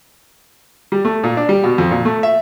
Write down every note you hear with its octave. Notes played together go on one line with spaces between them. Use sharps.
G3
A3
A#2
D4
G3
B2
F2
A#2
A3
E5